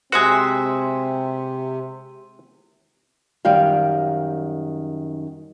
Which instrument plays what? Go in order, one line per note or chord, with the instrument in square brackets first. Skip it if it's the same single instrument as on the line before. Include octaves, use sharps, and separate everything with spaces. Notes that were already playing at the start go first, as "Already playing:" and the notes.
[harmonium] C3 [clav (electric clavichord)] G#3 F#4 [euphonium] C4 [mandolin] C5 E5 G#5
[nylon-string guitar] F#2 D#3 G3 F5 G5